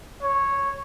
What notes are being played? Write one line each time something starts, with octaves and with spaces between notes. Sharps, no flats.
C#5